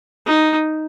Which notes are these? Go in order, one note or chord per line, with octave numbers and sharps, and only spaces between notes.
D#4